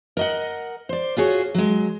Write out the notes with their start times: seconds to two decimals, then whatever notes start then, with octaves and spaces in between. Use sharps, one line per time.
0.17 A#4 D#5 F#5
0.89 C5 D5
1.17 F4 F#4 G#4 C#5
1.54 F#3 G#3